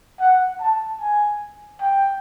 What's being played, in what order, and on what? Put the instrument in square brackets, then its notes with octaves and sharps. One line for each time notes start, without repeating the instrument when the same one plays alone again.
[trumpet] F#5
A5
G#5
G5